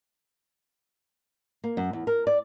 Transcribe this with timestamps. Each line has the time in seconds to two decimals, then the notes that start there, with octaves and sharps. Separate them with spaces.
1.64 A#3
1.77 F#2
1.93 E2
2.07 A#4
2.27 D5